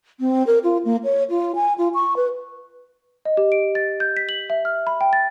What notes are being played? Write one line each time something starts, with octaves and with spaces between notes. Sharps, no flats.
C4
A#4
F4
A#3
C#5
F4
G#5
F4
C#6
B4
D#5
G4
D7
A6
G6
B6
F#7
E5
F6
B5
G5
A6